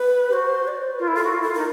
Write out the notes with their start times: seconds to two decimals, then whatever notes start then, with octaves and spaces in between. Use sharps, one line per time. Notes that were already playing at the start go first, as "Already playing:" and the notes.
Already playing: B4
0.29 G4
0.33 F#4 C5
0.68 D5
0.76 C#5
0.83 C5
0.91 B4
0.99 F4 A#4
1.07 E4
1.15 F4 A4
1.23 F#4
1.32 F4
1.39 E4
1.43 A4
1.48 F4
1.54 D#4 A#4